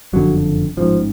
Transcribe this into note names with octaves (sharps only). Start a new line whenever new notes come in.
F#1 F2 D3 F#3
A1 G#2 F3